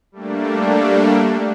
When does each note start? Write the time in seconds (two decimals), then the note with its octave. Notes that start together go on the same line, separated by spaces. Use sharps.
0.12 G3 A3 A#3 D4